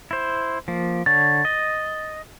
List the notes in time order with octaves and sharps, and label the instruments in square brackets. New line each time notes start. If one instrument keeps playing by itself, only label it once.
[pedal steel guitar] E4 C5
F3 A#3
[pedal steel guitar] D3 C#5 [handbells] A6
[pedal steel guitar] D#5